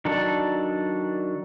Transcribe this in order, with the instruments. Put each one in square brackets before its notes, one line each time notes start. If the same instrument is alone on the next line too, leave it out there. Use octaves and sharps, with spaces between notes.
[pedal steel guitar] D#3 F#3 D4 A4 D5